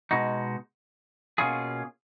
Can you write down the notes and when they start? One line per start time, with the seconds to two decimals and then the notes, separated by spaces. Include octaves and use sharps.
0.11 B2 G#3 D#4 F#4
1.38 B2 A#3 C#4 F4 G#4